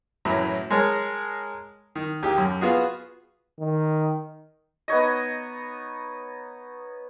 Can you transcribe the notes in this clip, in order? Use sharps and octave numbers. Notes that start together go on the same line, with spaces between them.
F#2 A2 E3 F#3
G#3 A#4 C#5 A5
D#3
D#2 G4 D#6
F#2
B3 F4 F#4 G#4
D#3
B3 D#4 C#5 D#5